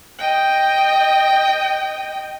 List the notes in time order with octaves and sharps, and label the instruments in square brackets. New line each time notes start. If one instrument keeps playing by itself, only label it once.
[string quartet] D#5 G5